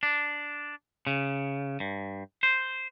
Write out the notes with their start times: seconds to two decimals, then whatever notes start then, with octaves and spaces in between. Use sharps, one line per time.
0.03 D4
1.07 C#3
1.80 G2
2.43 C5